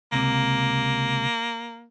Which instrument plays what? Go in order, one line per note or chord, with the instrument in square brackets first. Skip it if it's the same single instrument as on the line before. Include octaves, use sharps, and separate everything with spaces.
[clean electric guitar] C#2 C3 [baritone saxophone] A#3